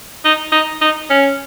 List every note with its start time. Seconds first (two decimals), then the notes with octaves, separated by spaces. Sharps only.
0.25 D#4
0.52 D#4
0.82 D#4
1.10 C#4